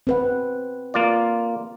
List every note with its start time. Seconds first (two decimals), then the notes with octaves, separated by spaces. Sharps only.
0.07 C4 B4 F#5
0.94 A#3 F4 D5